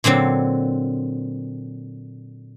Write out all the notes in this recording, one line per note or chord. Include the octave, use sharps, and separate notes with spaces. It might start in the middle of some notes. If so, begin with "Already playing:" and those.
A#2 D3 F#3 C4